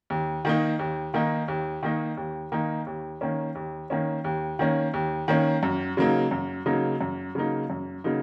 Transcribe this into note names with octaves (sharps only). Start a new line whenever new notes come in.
D#2
D#3 A#3 D#4
D#2
D#3 A#3 D#4
D#2
D#3 A#3 D#4
D#2
D#3 A#3 D#4
D#2
D#3 A#3 C#4
D#2
D#3 A#3 C#4
D#2
D#3 A#3 C#4
D#2
D#3 A#3 C#4
F#2
C#3 F#3 A#3 D#4
F#2
C#3 F#3 A#3 D#4
F#2
C#3 F#3 A#3 D#4
F#2
C#3 F#3 A#3 D#4